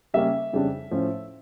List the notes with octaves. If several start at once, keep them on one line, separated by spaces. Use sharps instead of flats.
C#3 G3 A#3 C#4 E5
F2 C#3 G3 D4
A2 F3 C#4